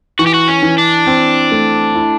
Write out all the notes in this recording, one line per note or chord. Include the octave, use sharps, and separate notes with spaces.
E3 F#4
G4
F#4
C#4
E3
D4
C4
A3
E4